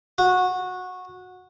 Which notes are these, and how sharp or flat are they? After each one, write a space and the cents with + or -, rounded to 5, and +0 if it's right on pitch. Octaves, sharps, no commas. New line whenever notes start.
F#4 -15